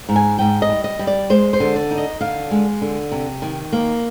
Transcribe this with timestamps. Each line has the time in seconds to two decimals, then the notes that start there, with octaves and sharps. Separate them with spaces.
0.09 G#2
0.16 G#5
0.39 G#2 G5
0.62 D#5
0.69 G3
0.84 D#5
0.99 G3
1.07 D5
1.30 G#3 C5
1.53 C5
1.60 D3
1.76 D5
1.91 D#4
1.98 D#5
2.21 D3 F5
2.51 G#3
2.82 D3
3.12 C3
3.42 D#3
3.72 A#3